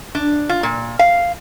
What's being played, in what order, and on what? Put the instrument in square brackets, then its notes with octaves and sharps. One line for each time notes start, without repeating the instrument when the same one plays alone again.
[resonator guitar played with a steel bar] D4
F4
A#2
F5